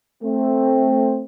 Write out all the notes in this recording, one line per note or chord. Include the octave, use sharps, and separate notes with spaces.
A3 C4